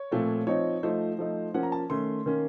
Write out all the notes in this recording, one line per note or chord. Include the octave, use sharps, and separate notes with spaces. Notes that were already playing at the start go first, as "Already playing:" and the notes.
Already playing: C#5
A#2 F3 A3 C4
F3 C4 D#4 C#5
F3 A3 D#4 C5
F3 A3 D#4
F3 A#3 C#4 F#5
A#5
A5
D#3 A3 C#4 C6
D#3 A#3 C#4